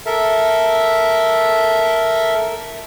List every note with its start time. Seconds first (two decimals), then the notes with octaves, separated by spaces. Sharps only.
0.06 A4 A#4 E5